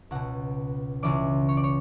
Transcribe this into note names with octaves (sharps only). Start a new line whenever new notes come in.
C#2 B2 F#5
C#2 C#3 E3 D5
C#5
D5
C#5